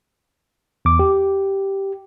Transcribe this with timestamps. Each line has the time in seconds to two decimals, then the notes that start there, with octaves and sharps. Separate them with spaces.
0.85 E2 D6
0.99 G4